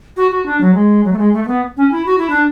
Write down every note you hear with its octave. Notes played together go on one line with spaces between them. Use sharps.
F#4
F#4
D4
F#3
G#3
F#3
A3
G#3
A3
A3
B3
C#4
E4
F#4
E4
D4